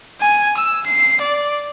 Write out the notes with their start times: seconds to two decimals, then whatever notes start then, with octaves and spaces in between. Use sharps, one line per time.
0.21 G#5
0.57 E6
0.86 C7
1.21 D5